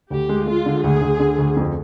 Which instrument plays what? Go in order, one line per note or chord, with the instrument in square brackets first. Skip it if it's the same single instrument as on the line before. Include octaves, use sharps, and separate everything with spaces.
[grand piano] D2 [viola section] G4
[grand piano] G#3
[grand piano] G#3 [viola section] F4
[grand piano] D3
[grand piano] D2 [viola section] G#4
[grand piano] D2
D3
D2
F2